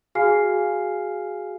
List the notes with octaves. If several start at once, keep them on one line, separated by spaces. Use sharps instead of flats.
F#4 G#4 F5 G#5 F6 C7